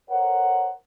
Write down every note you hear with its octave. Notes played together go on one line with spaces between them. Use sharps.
A4 A#4 C5 C#5 F#5